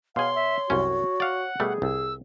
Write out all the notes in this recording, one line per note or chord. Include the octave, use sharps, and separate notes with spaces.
B2 G#4 C#5 F5 C6
E5
C2 F#2 C#4 F#4
D5 F5 F#5
B2 G3 A3 G#4
C2 E6